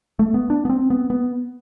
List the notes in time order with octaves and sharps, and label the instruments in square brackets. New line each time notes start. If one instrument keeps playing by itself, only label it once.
[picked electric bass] A3
B3
D4
B3
C4
B3
B3